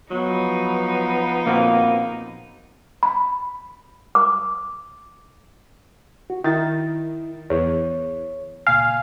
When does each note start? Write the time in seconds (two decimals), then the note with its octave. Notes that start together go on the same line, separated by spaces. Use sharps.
0.11 F3 F#3 B3 D#4
1.46 A#2 A#3 C4 F#4
3.03 B5
4.15 D6
6.30 F#4
6.44 D#3 E4 A6
7.50 E2 C#5
8.66 C#2 A#2 F5 G#5